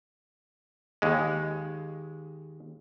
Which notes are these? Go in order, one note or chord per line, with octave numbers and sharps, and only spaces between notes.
D#2 G#3